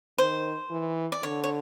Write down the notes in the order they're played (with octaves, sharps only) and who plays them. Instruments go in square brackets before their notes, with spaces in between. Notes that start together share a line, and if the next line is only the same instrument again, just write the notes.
[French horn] D#3 [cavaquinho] C5
[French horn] E3
[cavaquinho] D5
[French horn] D3 [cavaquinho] C#5
[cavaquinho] C#5